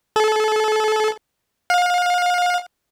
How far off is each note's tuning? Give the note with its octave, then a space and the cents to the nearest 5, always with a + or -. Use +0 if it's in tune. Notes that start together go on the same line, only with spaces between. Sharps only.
A4 -30
F5 +35